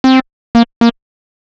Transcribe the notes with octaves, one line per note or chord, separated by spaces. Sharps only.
C4
A#3
A#3